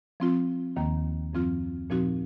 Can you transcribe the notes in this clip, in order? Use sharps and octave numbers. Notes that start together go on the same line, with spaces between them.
F3 C4 F4
D#2 D#3 A#3
F#2 F3 C4 F4
A#2 F3 C4 D#4 F#4